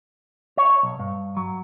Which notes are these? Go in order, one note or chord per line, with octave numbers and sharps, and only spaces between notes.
C#5
B1
G2
F#3